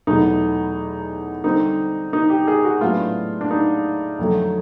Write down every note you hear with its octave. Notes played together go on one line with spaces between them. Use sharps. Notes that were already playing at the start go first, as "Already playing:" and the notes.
E2 B2 F#3 A3 D#4
D3 G3 C4 D#4
D#4
G4
G#4
F#4
A2 F#3 B3 D4 F4
D4
D#4
F2 D3 F#3 A3